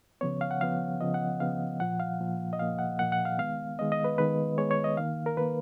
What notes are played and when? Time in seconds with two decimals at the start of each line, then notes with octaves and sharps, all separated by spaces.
0.21 C#3 F3 B3 C#5
0.41 F5
0.51 F#5
0.60 C#3 F3 B3 F5
1.00 C#3 F3 B3 D#5
1.14 F#5
1.40 C#3 F3 B3 F5
1.80 A#2 F3 A#3 F#5
2.00 F5
2.20 A#2 F3 A#3
2.53 D#5
2.59 A#2 F3 A#3 F5
2.79 F#5
2.99 A#2 F3 A#3 F#5
3.12 F#5
3.25 F5
3.38 D#3 G#3 B3 F5
3.79 D#3 G#3 B3 D#5
3.92 D#5
4.04 B4
4.18 D#3 G#3 B3 B4
4.58 D#3 G#3 B3 C#5
4.71 C#5
4.84 D#5
4.97 D#3 A#3 F5
5.26 A#4
5.37 D#3 A#3 B4